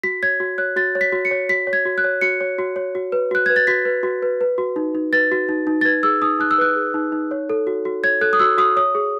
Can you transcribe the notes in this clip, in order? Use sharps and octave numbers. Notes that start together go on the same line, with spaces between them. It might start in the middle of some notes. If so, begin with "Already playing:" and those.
F#4 B6
C#5 G#6
F#4
C#5 F#6
F#4 A6
C#5
B6
F#4
C#7
C#5
F#4 B6
C#5
G#6
F#4
F#6
C#5
F#4 C#7
C#5
F#4
C#5
F#4
B4
F#4 F#6
B4 G#6
A6
F#4 B6
B4
F#4
B4
B4
F#4
D#4
D#4
B4 A6
F#4
D#4
D#4
A6
B4 G#6
G#4 E6
D#4 D#6
D#4 F#6
E6
B4 F#6
G#4
D#4
D#4
C#5
A4
F#4
F#4
C#5 G#6
A4 F#6
D#6
F#4 E6
F#4 D#6
C#5 D#6
G#4